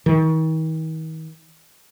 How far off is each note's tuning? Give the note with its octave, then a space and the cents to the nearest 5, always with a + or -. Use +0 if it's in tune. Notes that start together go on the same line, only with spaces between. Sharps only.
D#3 +40